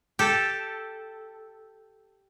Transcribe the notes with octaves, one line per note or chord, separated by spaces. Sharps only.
G4 A4